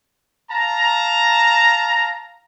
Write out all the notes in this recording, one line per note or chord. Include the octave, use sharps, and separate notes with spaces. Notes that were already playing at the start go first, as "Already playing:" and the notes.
F5 A5 A#5